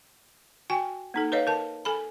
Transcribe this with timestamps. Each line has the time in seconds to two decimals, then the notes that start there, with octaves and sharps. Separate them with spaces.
0.70 F#4 G5 G#5
1.14 A#3 D#4 A4
1.32 B4 C#5 D#5 F5
1.47 A#4 A5
1.85 A4 G#5 B5